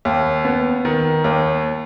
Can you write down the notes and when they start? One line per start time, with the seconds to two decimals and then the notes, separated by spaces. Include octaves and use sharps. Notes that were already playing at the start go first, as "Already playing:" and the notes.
0.05 D#2
0.45 B3
0.85 D#3
1.24 D#2